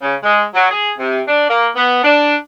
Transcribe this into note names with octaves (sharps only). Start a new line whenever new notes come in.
C#3
G#3
F#3
G#4
C3
D4
A#3
B3
D4